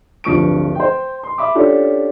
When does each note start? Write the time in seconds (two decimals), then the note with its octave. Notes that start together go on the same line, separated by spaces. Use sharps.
0.24 D1 G2 F3 C#6 D7
0.75 C5 G5
1.23 C6
1.38 E5 B5 D6
1.55 C#4 D4 F4 G4 A4